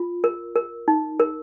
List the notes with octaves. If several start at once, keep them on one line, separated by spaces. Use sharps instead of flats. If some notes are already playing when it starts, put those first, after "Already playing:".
Already playing: F4
A#4
A#4
D#4
A#4